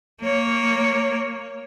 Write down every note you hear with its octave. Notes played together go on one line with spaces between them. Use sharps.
A#3 C#5